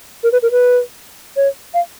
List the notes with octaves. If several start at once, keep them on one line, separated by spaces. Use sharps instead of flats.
A#4
B4
A#4
B4
C#5
F5